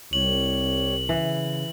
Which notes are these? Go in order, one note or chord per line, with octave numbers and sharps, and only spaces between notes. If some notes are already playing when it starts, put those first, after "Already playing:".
C2 G3 C#5 F#7
C#3 E3